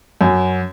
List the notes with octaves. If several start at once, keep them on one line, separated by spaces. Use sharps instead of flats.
F#2